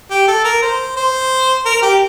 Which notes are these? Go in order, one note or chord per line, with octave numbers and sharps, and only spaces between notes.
G4
A4
A#4
C5
C5
A#4
G4